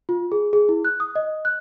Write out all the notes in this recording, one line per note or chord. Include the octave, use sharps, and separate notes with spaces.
F4
G#4
G#4
E4
F#6
D#6
D#5
F#6